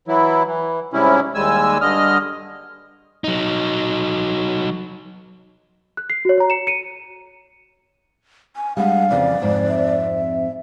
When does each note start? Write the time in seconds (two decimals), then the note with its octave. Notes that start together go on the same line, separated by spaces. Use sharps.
0.08 E3 F#3 E4
0.46 E3
0.93 G#2 C3 G3 C#4 E4
1.35 D#2 G3 G#3 G#5 E6
1.81 G2 D3 D#5 F6
3.24 F#3 D#4
5.97 F#6
6.10 C7
6.25 F#4 C#5
6.38 C#5 A#5
6.50 C#7 E7
6.67 C#7 D#7
8.56 G#5
8.77 G3 G#3 D4 F5 F#5
9.10 F2 C#3 E3 D5
9.42 F2 G#2 C4
9.69 E5